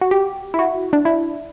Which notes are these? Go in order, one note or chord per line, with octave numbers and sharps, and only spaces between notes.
F#4
G4
E4
F#4
D4
E4